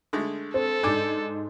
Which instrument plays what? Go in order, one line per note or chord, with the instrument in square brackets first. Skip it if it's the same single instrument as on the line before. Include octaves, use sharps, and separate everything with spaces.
[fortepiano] D3 G#3 A3
[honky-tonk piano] C4 [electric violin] A4
[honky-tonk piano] G#2 G6 [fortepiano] D4 G#5 D6